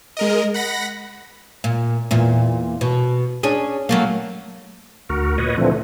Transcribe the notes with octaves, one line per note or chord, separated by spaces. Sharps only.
G#3 A#4 D#5
F#5 B5 A#6
A#2
E2 A#2
B2
C#4 D4 G#4
F#3 A3 A#3
D2 F#4 A#4
A#2 B4 C#5 D#5
A#2 D3 E3 F3 A3 C4